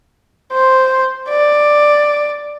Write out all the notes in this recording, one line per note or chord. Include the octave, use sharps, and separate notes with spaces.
C5
D5